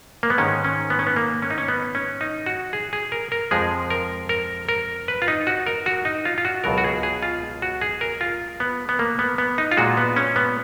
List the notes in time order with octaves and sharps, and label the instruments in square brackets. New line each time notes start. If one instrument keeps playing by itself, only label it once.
[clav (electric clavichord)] A#3
B3
G#2 D#3 G#3 C#4
C#4
B3
C#4
B3
A#3
C#4
D#4
C#4
B3
C#4
D#4
F#4
G#4
G#4
A#4
A#4
F2 F3 G#3 G#4
A#4
A#4
A#4
B4
F4
D#4
F#4
A#4
F#4
D#4
F4
F4
F#4
C#2 B2 F#3 A#4
F#4
G#4
G#4
F4
F#4
G#4
A#4
F4
B3
B3
A#3
B3
B3
D#4
F4
A#2 G#3 F#4
B3
C#4
B3